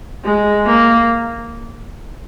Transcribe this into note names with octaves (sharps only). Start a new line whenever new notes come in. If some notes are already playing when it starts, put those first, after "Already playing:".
G#3
A#3